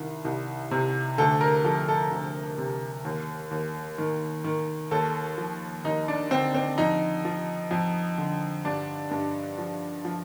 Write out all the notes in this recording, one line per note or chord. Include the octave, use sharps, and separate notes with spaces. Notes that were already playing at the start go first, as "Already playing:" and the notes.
Already playing: C2 D#3
C2
C3
D2 A4
A#4
F3 A4
A4
D2
C3
D#2
D#2
D#3
D#3
D#2 A4
F3
D#2 D#4
D4
D3 C4
C4
F2 D#4
F3
F2
D3
G2 D4
G2
F3
F3